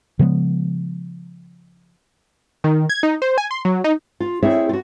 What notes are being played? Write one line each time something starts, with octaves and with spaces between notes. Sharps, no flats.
C#3 F3 G#3 B3
D#3
G#6
D#4
C5
G#5
C6
F#3
D#4
F4
A3 C4 E4 G#4 C#5 E5
F4 F#4